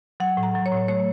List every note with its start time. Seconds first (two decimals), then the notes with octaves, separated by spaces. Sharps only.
0.20 F#3 F#5
0.37 A2
0.43 A#5
0.55 F#3
0.66 C#5
0.71 A2
0.88 A3 C#5